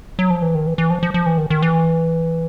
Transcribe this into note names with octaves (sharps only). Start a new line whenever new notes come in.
F#3
F3
E3
D#3
E3
E3
F3
F3
F3
E3
D#3
D#3
E3